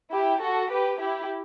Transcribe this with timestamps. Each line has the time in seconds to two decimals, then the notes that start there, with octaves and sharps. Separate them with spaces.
0.12 E4 G4
0.42 F#4 A4
0.71 G4 B4
1.00 E4 G4